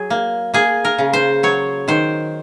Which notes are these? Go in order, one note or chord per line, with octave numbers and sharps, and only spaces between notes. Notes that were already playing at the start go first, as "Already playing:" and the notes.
Already playing: F#3 G#4
A#3
A#3 G#4
A#4
C#3
C5
F#3 C#5
D#3 C5